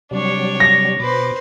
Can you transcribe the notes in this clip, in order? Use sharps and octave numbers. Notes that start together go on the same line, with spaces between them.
C3 F#3 G3 D4 C#5
A#6
B2 B4 C5 D6